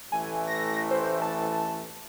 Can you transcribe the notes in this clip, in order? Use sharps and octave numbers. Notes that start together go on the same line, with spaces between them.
A1 E3 A3 G#5
A#6
C5
A5